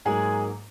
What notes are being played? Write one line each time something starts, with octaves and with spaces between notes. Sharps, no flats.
G#2 F#3 G#3 A#3 G#4